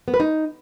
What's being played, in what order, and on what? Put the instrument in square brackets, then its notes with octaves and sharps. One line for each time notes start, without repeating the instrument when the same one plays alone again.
[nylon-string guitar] B3
B4
D#4